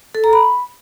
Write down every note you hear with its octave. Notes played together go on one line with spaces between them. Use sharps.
A4
A#5
B5